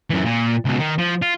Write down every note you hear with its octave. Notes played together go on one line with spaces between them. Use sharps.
F#2 E3
A#2
C#2 B2
D#3
F3
F4